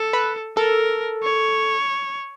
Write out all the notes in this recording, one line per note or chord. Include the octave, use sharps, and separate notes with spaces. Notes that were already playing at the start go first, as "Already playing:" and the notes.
Already playing: A4
B4
A4 A#4
C#5